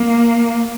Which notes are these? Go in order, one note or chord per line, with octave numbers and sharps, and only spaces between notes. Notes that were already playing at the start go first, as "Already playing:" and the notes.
Already playing: A#3